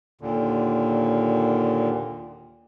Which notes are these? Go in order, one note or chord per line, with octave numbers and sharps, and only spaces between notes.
D#2 A#2 D3